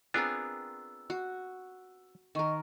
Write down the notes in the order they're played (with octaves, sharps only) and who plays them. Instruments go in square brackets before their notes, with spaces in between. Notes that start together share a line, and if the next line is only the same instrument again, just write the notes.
[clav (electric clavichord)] B3 D4 F4 [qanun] C4 G#4 A#4 [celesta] E6
[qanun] F#4
[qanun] D#3 A#4 [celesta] D#5 C#6